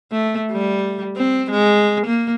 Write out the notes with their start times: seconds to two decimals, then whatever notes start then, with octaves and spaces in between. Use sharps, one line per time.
0.12 A3
0.52 G3
1.16 C4
1.51 G#3
2.06 A#3